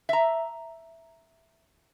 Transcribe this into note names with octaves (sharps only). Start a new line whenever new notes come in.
E5 A#5